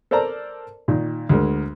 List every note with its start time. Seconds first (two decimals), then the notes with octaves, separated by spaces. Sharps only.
0.11 A4 A#4 C5 D5 A5 A#5
0.88 A#2 D#3
1.29 D2 G#3 A#4